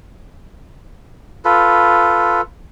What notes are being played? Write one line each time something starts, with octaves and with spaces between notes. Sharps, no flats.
F4 A4 B4